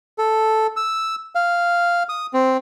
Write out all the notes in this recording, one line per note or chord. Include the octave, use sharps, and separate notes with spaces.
A4
E6
F5
D#6
C4